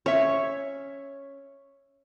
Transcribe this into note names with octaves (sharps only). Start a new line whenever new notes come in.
C#4 C#5 E5